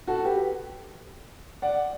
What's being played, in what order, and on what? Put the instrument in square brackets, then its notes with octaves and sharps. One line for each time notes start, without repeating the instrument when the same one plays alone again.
[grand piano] F#4 A4
G4 B4
D5 F#5